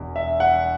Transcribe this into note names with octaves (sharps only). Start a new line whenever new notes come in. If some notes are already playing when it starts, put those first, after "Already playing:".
Already playing: E1 E2
E5
F#5